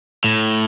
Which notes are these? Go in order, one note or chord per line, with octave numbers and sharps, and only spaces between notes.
A2